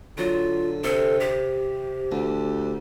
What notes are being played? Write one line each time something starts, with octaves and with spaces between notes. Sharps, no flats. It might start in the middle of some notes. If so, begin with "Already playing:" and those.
D3 F#3 F4 A#5
C3 A4
G4
D2 D4